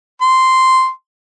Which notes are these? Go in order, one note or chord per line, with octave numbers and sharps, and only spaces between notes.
C6